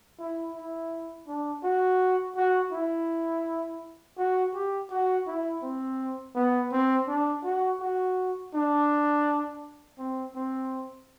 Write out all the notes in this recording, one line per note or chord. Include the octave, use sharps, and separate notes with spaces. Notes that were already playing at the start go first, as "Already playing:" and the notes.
E4
E4
D4
F#4
F#4
E4
F#4
G4
F#4
E4
C4
B3
C4
D4
F#4
F#4
D4
C4
C4